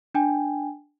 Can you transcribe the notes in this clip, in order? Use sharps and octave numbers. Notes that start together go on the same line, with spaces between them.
D4 G5 G#5